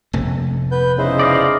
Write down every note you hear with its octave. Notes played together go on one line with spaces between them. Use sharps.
F1 A3
B3 B4 G6
C#3 D#4 E4 C5
D5 D#5 F5